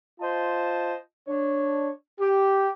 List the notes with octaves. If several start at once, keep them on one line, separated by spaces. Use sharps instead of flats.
F4 C5 D#5 A5
D4 C#5
G4